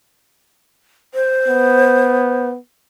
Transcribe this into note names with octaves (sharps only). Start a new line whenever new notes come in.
C5
B3